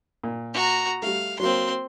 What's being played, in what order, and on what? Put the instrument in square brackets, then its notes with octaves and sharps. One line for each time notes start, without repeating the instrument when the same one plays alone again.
[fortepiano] A#2
[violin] F#4 A#5
[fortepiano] G3 A3 [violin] F5
[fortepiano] F#3 A#3 [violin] C4 C6